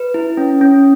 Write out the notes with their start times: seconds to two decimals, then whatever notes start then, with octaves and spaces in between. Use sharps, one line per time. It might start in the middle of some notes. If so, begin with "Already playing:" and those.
Already playing: B4
0.14 E4
0.37 C#4
0.61 C#4